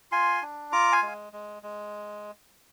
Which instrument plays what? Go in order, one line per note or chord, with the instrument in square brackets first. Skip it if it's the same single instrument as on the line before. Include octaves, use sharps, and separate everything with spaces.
[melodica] F4 G#5 C6
D4
F4 A#5 D6
F5 G#5
G#3
G#3
G#3